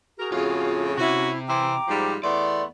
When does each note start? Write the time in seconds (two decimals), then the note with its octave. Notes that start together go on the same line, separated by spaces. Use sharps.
0.18 F#4 G#4 A#4
0.32 F2 A2 C#3 F4
0.98 C3 C#4 E4 F#4 E5
1.48 E3 E4 C5 G5 A#5 D6
1.88 G#2 F3 G3
2.24 E2 A3 B3 D5 C6